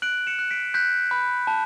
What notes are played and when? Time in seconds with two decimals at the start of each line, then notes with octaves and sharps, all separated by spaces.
0.02 F#6 D7 F#7
0.27 C#7 E7
0.39 F#6
0.51 B6 D7
0.74 F#6 G6 B6
1.11 B5
1.47 A5